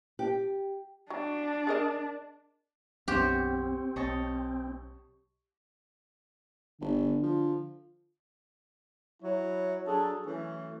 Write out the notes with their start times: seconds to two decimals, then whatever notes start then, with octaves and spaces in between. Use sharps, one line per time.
0.19 G4
1.10 F#3 D4
1.67 G#4 A#4 D#5
3.08 B1 F#2 B2 C4 G4 C5 C#5 F#5
3.96 B1 C#5 D#5 A5
6.81 G1 D3
7.23 F3
9.23 F#3 E4 C#5
9.86 F#3 D4 G#4 A4
10.25 E3 F#3 A3 C#4